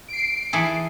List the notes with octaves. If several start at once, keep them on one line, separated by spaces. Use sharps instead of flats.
C7 D7
E3 G#4 A4